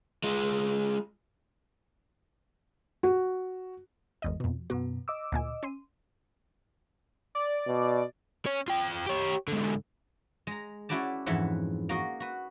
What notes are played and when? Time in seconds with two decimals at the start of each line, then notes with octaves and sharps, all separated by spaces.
0.24 G#3 F4
3.03 F#4
4.22 G#1 E2 D#5
4.40 F2 B2
4.70 F#2 B2 B3 F#4
5.08 D#5 D6 E6
5.32 D2 A#2 G#5
5.63 C#4 C6 D#7
7.35 D5
7.67 B2
8.46 C#4 C#5
8.68 F4 G5
9.07 G4 C#5
9.48 G#2 D3
10.47 G#3 A#5
10.89 C#4 E4 F#4 B4 D5 A5
11.26 F2 G#2 E3 E5 F#5
11.89 A#3 F#4 D#5
12.20 F#4 B4